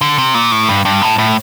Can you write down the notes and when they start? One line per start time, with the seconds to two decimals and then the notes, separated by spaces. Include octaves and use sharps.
0.01 D3
0.18 C3
0.34 A#2
0.52 A2
0.69 G2
0.85 G2
1.02 A2
1.18 A2